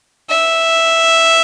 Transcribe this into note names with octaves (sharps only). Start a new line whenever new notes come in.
E5